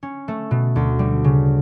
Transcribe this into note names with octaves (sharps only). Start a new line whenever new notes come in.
C#4
A3
B2
D2
G3
C#3